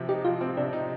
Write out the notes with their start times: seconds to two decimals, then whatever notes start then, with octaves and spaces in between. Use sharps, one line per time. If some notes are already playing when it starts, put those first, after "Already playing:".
Already playing: C3 F3 C4
0.09 D#4 G4
0.25 F3 F4
0.41 C4
0.57 C3 D4
0.73 D#4